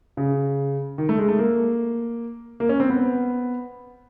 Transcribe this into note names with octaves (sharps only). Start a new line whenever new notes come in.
C#3
D#3
A3
G#3
A3
A#3
A#3
C#4
C4
B3